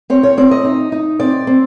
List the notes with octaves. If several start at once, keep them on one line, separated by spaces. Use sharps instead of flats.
C4 C#5
C#5
C4 D5
D#5
D#4
D#4
C4 D5
C4